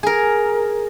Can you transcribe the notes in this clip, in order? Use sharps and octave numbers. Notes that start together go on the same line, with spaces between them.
G#4 A#4